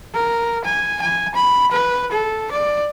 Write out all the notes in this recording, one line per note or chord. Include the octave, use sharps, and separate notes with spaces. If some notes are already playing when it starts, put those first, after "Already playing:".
A#4
G#5
G#5
B5
B4
A4
D5